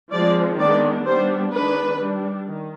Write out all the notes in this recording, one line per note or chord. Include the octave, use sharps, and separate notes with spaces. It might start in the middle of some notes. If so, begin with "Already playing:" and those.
F3 G#3 C4 D5
D#3 G#3 B3 D4 D5
G3 B3 D4 C5
D#3 G#3 D4 B4
G3 D4
D#3